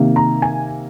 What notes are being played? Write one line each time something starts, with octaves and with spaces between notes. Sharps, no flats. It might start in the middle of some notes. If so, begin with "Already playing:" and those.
Already playing: C3 D#3 A#3
A#5
G#5